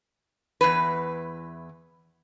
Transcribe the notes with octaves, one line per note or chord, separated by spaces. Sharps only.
E2 G#2 E3 B4